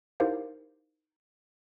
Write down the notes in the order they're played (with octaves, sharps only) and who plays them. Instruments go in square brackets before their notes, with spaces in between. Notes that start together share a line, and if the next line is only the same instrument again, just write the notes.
[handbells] D#4 E4 G4 A#4 C5 F5